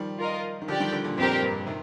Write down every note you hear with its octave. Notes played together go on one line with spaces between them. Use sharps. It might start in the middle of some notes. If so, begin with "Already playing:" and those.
Already playing: D#3 F3 G3
F4 A#4 D#5
D#3
D3 F3 G4 D5 G5
D#3 G3
D3 F3
A#2 D3
F2 C4 G4 A#4
G2
C3 D#3